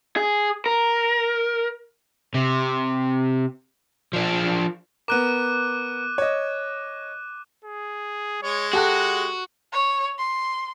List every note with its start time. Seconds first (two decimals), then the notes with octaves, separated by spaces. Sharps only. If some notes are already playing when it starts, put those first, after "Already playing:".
0.17 G#4
0.66 A#4
2.34 C3
4.13 F3 D4
5.08 B3 A#4 D6 F#6 D#7
6.18 C#5 D#5
7.65 G#4
8.42 G#3 C#5
8.73 F#4 G4 A4 F#5 F#6
9.73 C#5
10.19 C6